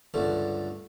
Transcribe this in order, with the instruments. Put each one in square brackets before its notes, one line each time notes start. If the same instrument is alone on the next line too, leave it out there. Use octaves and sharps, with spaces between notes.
[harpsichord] C#2 G2 D3 A3